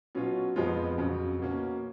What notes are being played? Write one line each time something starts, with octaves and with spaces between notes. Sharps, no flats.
B2 F#3 C#4 F4
F2 F3 G#3 B3 F4
F2 C#3 F#3
B2 A#3 C#4